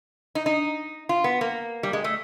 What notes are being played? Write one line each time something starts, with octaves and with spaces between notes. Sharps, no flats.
D#4
D#4
F4
B3
A#3
G3
G#3
A3